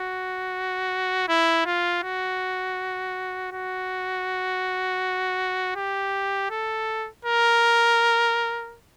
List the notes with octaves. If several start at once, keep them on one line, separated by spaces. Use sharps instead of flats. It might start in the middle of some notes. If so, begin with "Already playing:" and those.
Already playing: F#4
E4
F4
F#4
F#4
G4
A4
A#4